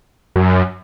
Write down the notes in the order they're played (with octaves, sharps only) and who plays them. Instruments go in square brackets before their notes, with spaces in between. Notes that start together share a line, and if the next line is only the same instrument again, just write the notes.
[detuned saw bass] F#2